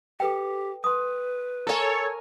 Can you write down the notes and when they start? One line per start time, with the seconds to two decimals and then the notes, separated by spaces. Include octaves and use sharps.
0.20 G4 A4 B4 G5
0.84 B4 C6 D#6
1.67 A4 A#4 C#5 G#5